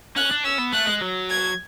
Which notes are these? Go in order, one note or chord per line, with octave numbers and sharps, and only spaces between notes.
C#4 F#6
D4
C#4 E6
B3
A3 F#6
G#3
F#3
G#6